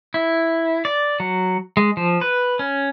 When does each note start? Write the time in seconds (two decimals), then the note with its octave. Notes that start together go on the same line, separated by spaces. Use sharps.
0.14 E4
0.85 D5
1.20 F#3
1.77 G#3
1.97 F3
2.21 B4
2.59 C#4